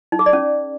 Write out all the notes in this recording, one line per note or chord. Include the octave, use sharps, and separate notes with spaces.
D#4
G#4
D5
C#4